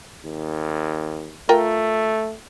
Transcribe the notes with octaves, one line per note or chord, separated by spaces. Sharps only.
D#2
A3 F4 A#4 G5